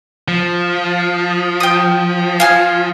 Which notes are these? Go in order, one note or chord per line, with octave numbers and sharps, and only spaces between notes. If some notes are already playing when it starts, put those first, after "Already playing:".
F3
G5 D#6
F5 G#5 F6